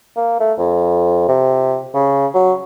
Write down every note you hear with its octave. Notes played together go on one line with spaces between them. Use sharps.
A#3
A3
F2
C3
C#3
F#3